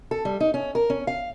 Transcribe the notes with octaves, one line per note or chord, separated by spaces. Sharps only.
A4
G3
D#4
C#4
A#4
C#4
F5